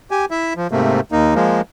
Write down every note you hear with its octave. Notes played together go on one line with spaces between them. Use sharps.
G4 G#5
E4 E5
F3
G#2 C3 A3 A#3
D#2 A#3 D#4
F3 G#3 A#3